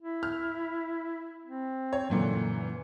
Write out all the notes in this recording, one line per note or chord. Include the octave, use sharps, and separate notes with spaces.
E4
F6
C4
C#5
F#2 A#2 D3 E3